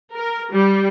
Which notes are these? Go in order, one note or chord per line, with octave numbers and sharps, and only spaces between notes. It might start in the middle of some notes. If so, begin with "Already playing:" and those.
A#4
G3